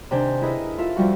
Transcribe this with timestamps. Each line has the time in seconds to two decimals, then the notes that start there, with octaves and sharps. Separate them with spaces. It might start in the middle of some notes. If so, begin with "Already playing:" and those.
0.11 C3 D#3 D4 C5 G#5
0.41 E4 G#4 A#4 B4 D#5 E5
0.78 F4 A4 E5 F5
0.96 F2 F3 G3 F#4